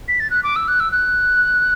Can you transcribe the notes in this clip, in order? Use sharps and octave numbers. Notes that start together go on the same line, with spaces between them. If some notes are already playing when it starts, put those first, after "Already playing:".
B6
A6
F#6
D6
E6
F#6
E6
F#6